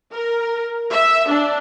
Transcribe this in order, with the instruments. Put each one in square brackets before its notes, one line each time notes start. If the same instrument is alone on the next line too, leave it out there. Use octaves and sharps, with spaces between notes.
[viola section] A#4
E5
D4